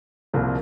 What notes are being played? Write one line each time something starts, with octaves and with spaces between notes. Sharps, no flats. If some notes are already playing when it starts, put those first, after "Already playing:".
C2 A#2 F3 A#3